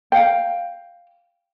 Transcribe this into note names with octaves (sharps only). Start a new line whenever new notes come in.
F5 G5